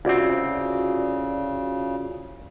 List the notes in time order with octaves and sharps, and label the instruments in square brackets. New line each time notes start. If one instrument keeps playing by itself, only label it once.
[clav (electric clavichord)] C2 C4 [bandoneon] C#3 [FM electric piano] F4 F#4 D5